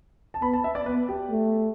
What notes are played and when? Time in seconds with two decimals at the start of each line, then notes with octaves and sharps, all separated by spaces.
0.34 A5
0.42 B3 B5
0.53 A5
0.64 E5
0.75 D5
0.86 B3 B4
1.09 G4
1.30 A3